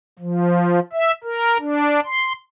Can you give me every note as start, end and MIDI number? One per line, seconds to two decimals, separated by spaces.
0.19 0.80 53
0.93 1.11 76
1.23 1.57 70
1.59 2.00 62
2.05 2.32 84